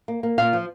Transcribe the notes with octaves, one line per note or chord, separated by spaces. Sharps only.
A#3
A#3
A#2 F5
F3